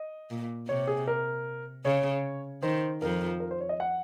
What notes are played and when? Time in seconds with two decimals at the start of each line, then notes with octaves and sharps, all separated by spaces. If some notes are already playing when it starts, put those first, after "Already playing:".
Already playing: D#5
0.30 A#2
0.68 C3 C#5
0.87 G#4
1.08 A#4
1.85 C#3 C#5
2.62 D#3 C5
3.02 F2 F3 A#4
3.40 A#4
3.51 C5
3.61 C#5
3.69 D#5
3.80 F#5